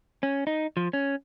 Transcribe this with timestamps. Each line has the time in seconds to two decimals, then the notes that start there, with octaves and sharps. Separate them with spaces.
0.23 C#4
0.47 D#4
0.77 F3
0.93 C#4